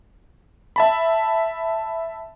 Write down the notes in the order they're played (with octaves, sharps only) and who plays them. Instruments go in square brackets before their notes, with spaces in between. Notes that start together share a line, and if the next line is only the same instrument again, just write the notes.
[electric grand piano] E5 A5 B5